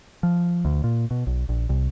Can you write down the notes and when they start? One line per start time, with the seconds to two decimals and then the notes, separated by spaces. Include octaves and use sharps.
0.23 F3
0.65 D2
0.84 A#2
1.11 B2
1.27 B1
1.49 A#1
1.69 C2